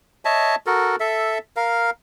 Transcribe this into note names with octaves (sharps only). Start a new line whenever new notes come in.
C#5 D#5 E5 A5
F#4 A4 A#4
A4 E5
A#4 F5